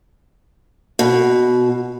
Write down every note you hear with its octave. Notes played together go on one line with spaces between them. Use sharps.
B2